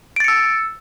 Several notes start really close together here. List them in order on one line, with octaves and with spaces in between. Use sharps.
D7 A6 C#7 E6